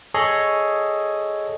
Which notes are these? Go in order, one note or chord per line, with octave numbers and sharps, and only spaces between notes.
G#4 A4 C#5 D#5